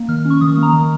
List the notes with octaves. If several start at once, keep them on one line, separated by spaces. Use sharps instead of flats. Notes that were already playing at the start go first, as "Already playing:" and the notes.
Already playing: A#3
D#3 F6
C#4
C#6
D#3 D#6
A#3
A#5
D#3